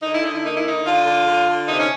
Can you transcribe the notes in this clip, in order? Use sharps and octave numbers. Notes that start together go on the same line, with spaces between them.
D3 D#4
E4
D3 D#4
E4
A#3 D#4
E4
D3 D#4
D3 F4
D3
D3
D3
C3 D#4
C#4